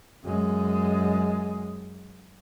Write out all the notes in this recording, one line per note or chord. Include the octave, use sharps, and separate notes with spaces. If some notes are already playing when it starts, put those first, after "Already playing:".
F#2 G#3